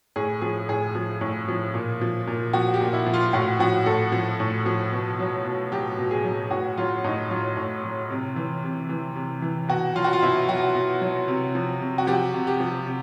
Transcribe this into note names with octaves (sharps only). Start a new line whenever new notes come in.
A2 G#4
F3 G#4
A2 G#4
F3
A2
F3
A#2
F3
A#2
F3 F#4
G4
A#2
E4
F3
F4
A2 F#4
F3 F#4
A2 A4
F3
A2
F3
B2
F#3
B2
F#3 G4
B2
G#4
F#3
A2 F#4
F#3 F4
A2 D#4
F#3 F4
A2
F#3
C3
E3
C3
E3
C3
E3
B2 F#4
F#3 F4
F#4
F4
B2 E4
F#3 F#4
B2
F#3
C3
F3
C3
F#4
F3 G4
C3
G4
F3
C3